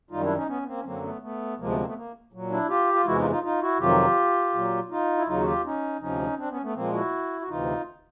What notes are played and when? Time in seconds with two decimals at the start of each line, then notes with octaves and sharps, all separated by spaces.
0.10 F#2 D#3 G3 D#4 F4
0.23 D4 E4
0.35 C#4 D#4
0.47 B3 C#4
0.62 B3
0.67 A#3 C4
0.77 C#4
0.84 F#2 D3 F#3 A#3 C4
1.03 A3 B3
1.21 A3 B3
1.58 D2 C3 F3 G#3 A#3
1.68 A3 B3
1.77 A#3 C4
1.86 A3 B3
1.96 A#3
2.33 A#2 F#3
2.50 D4 E4
2.68 F4 G4
2.94 F4
3.06 E2 C3 E3 G#3 E4 F#4
3.18 D#4 F4
3.30 D#4 F4
3.43 D#4 F4
3.61 E4 F#4
3.79 F2 C3 D#3 F#3 F4 G4
4.54 A#2 F#3
4.90 D#4 F4
5.18 E4
5.27 D#2 C#3 F#3 D#4 F4
5.41 F#4
5.45 F4 G4
5.65 C#4 D#4
6.01 D2 C3 F3 C#4 D#4
6.38 C4 D4
6.50 B3 C#4
6.62 A3 B3
6.74 A#2 F3 G#3 A#3 C4
6.93 E4 F#4
7.41 F#4
7.48 D2 C3 E3 D#4 F4